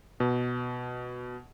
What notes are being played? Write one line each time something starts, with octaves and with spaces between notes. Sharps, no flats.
B2